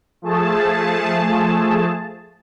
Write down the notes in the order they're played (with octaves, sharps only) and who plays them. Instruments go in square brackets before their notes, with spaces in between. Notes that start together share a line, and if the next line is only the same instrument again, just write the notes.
[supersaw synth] F3 A3 G#4 A5